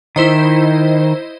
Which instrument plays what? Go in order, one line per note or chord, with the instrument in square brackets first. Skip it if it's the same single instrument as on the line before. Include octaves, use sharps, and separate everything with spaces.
[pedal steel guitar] D#3 [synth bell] E4 C5 D#5